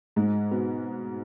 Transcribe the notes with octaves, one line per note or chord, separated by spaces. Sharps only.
G#2 G#3
B2 B3